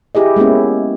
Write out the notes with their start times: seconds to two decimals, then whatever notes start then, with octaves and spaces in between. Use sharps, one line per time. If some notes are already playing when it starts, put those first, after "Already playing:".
0.15 E4 G4 G#4 D#5
0.36 G#3 A#3 B3 C#4 E4